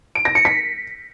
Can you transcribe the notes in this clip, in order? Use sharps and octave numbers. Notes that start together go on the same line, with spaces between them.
D7
A#6
C#7
B6